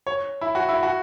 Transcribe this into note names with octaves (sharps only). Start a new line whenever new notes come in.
C#5
E4
F#4
E4
F#4